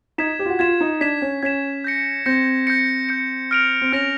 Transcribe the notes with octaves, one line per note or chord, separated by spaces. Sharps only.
D#4 G#6 B6 E7
G4
F4
F#4
F4 G#6 B6 E7
D#4
D4 G#6 B6 E7
C#4
C#4 G#6 B6 E7
G6 A#6 C#7
C4 G6 A#6 C#7
G6 A#6 C#7
G6 A#6 C#7
F6 A#6 D7 F7
C4
C#4 F6 A#6 D7 F7